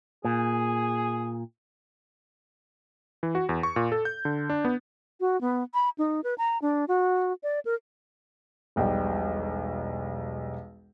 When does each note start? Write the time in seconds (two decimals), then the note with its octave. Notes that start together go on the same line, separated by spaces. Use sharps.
0.25 A#2 G#4
3.23 E3
3.35 F#4
3.49 E2
3.63 C#6
3.76 A#2
3.92 A4
4.05 G6
4.25 D3
4.50 D4
4.65 B3
5.20 F#4
5.41 B3
5.74 B5
5.98 D#4
6.24 B4
6.38 A#5
6.62 D4
6.88 F#4
7.43 D5
7.65 A#4
8.76 E1 B1 G3 G5